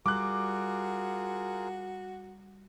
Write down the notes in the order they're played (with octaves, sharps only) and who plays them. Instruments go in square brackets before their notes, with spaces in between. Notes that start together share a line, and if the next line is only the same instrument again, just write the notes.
[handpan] G3 [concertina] F4 G#4 A#4 [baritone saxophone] F#4 [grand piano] D6 F#6